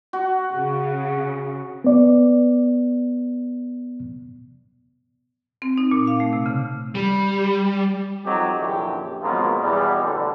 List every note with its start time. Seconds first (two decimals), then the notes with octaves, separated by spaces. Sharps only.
0.13 F#4
0.53 C#3
1.84 B3 D5
5.62 C4
5.78 D#4
5.91 A#2
6.07 F5
6.20 A3
6.33 C3
6.46 C#3
6.95 G3
8.26 F2 F#3 D#4 G4
8.59 A#1 F#2 D3 E3 F#3 G4
9.22 G#1 B2 F3 F#3 G#3 A#3
9.61 E2 B2 G3
10.03 A1 D3